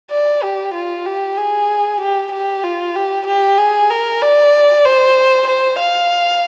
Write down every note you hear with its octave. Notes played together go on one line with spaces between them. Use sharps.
D5
G4
F4
G4
G#4
G4
G4
F4
G4
G4
G#4
A#4
D5
C5
C5
F5